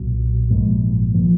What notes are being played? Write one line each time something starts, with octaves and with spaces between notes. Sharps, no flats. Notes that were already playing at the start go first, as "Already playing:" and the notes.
Already playing: B1 A#2 F#3
A#1 G#2 F3 A#3
F3 A#3